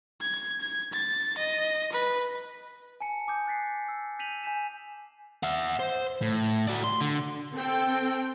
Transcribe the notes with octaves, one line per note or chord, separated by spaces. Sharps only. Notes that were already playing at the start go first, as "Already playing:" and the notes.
G#6
G#6
A6
D#5
B4
G#5 A5 C#7
G#5 D6 D#6 G6
F#6 A6 B6 C7
E6
G6 B6 D#7 F7 F#7
G#5 G6 B6 E7
E5 F#5
C5
A2
F#4 D5
C6
D3
C4 A4 G5